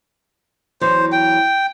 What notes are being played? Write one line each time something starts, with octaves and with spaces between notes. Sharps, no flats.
E2 E3 F#3 C5
G5